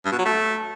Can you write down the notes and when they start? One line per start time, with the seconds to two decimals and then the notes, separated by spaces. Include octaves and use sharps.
0.05 G2
0.12 B2
0.19 F#3
0.25 A3